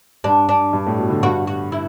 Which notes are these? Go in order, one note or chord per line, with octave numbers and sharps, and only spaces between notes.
G2 D4
D4
G2
A2
B2
D3
G2 F#4
F#4
E4